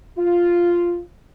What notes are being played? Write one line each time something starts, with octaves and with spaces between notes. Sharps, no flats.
F4